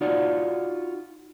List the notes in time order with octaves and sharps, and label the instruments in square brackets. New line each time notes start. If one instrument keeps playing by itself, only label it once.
[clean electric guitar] D#4 F4 F#4 D5